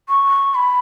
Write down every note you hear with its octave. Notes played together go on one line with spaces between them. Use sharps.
C#6
B5